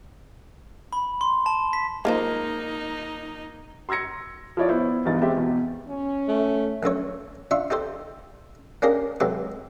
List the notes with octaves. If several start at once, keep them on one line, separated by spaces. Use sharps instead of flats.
B5
C6
A5
B6
G#3 A#3 D#4 F4 C5
C6 E6 G#6 A#6 C#7
F3 E4 C#5 D5
B3 E4 C5
E2 G2 B2 E3 D#4 A6
G#3 C4 G4 D#5 E5
E2 B2
C#4
A3
A#1 F#2 A4 C#5
D4 F4 E5 C#6
D#4 G4 A4 C5
A#3 C#4 D4 G4 G#4 A#4
C3 F#3 G#3 G4 A4 B4